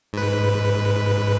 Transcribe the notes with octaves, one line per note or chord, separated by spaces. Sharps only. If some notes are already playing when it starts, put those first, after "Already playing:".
G#2 B4